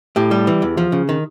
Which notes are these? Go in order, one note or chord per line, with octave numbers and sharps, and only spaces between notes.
A2 G4
G3
E3
E2
F3
C#3
D#3